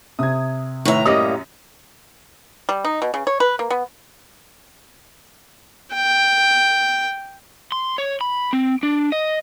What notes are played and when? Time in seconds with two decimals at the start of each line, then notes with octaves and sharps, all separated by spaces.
0.19 C3 D#6 G#6
0.85 A2 D#3 F#4 B4 E5 A#5
1.05 F#2 G3 A#3 D#5 D#6 A#6 D#7
2.69 G3
2.84 D#4
3.02 B2
3.14 C#3
3.27 C#5
3.40 B4
3.59 A#3
3.70 B3
5.94 G5
7.72 C6
7.98 C#5
8.21 B5
8.53 C4
8.83 D4
9.12 D#5